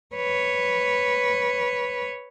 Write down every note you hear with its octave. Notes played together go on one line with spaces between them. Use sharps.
B4 C#5